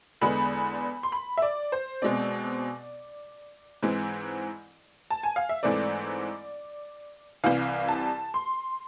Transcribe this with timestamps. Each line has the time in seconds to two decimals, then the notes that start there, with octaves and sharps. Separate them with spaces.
0.21 E2 D3 G#3 B3 B5
1.03 C6
1.12 B5
1.37 E5
1.42 D5
1.72 C5
2.02 B2 G#3 C4 D5
3.83 G#2 E3 G#3 C4
5.10 A5
5.23 G#5
5.36 F5
5.49 E5
5.63 G#2 E3 A3 C4 D5
7.44 C2 C3 E3 F5
7.88 A5
8.34 C6